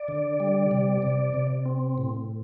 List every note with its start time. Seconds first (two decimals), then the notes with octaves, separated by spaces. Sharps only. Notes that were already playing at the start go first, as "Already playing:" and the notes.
Already playing: D5
0.08 D3
0.40 G3
0.71 C3
1.02 C3
1.34 C3
1.66 C4
1.98 A2